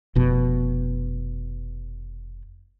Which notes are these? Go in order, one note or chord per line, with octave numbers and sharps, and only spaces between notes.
F1 B2